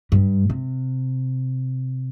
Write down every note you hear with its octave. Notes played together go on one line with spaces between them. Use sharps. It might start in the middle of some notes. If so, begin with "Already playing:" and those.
G2
C3